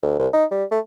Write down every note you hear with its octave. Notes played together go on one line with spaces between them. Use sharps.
D2
C2
D#4
G3
A3